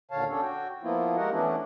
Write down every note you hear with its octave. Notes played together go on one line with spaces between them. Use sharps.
D#2 A#2 D3 C#5 F5 A5
C#4 D4 A4 C#5
F#4 G5
F3 A#3 B3 E4 F4
G#3 F#4 G4 A#4 D#5 F#5
E3 A3 B3 C#4 D4 E4